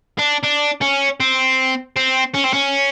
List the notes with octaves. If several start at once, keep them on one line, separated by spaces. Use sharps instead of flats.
D4
D4
C#4
C4
C4
C#4
C4
C#4